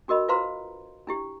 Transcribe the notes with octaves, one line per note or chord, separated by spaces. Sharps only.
D4 F#4 A#4 D#5 B5
F4 B4 C5 F5 A#5 C6
D4 E4 G4